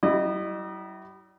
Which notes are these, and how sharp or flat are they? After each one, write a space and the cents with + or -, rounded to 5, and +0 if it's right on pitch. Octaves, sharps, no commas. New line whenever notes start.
G3 -45 E4 -5 D#5 -30